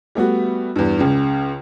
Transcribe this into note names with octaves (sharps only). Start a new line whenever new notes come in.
G3 A3 B3 F#4
E2 G2
C#2 C#3